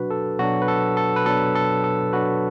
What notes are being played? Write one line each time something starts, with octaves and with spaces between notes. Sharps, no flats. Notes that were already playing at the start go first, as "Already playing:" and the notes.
Already playing: B2 F#3 D4 F#4 B4
A4
B2 F#3 D4 F#4
B4
A4
A4
B4
B2 F#3 D4 A4
A4
A4
B2 F#3 D4 F#4 B4